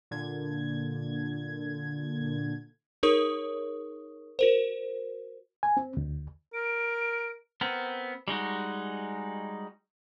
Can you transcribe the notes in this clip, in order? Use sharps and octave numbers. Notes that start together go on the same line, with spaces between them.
A#2 D3 G#6
D#4 G#4 A#4 C#5 C#6 D#6
F#4 A#4 C5
G#5
C4
D2
A#4 D7
B3 C4 A#4
G3 G#3 D#4 F#4